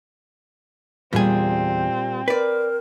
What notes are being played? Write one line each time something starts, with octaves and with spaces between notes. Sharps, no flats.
E2 A#2 G3 C4 G#4
A#4 B4 D5